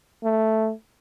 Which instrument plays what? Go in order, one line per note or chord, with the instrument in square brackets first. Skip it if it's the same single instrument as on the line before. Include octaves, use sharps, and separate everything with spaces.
[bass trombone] A3